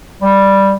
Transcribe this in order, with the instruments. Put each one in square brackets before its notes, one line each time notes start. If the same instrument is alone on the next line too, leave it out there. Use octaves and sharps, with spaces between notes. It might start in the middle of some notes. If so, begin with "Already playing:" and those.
[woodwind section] G3